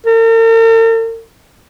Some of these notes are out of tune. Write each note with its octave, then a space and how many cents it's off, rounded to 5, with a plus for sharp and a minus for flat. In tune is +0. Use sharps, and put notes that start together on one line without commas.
A#4 -45